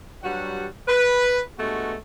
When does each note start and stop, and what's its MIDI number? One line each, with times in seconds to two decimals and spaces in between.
0.23 0.65 43
0.23 0.65 54
0.23 0.65 55
0.23 0.65 66
0.23 0.65 78
0.88 1.40 71
1.59 1.95 43
1.59 1.95 56
1.59 1.95 57
1.59 1.95 59
1.59 1.95 66